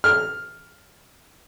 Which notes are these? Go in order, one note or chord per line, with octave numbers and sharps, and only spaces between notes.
F6